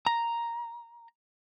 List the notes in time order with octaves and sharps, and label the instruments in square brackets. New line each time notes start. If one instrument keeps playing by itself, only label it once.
[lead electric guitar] A#5